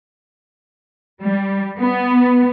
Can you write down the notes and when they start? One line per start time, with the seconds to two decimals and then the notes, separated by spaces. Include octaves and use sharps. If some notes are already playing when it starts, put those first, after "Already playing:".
1.21 G3
1.80 B3